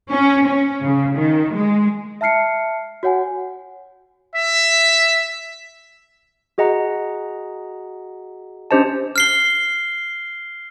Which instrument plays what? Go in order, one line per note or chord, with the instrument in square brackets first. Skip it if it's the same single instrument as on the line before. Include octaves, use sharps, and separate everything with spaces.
[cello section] C#4
C#4
C#3
D#3
G#3
[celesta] E5 A5 F6 C7 C#7
F#4 C#5 F#5 G#5
[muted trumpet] E5
[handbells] F#4 G#4 D#5 F#5 A#5
C#4 D4 G4 C5 D#5 A5
[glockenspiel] F6 C7 G7